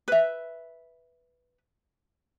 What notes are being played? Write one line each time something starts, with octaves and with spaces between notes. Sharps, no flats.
B4 E5